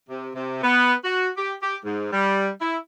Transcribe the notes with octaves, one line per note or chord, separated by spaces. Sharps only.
C3
C3
B3
F#4
G4
G4
G#2
G3
E4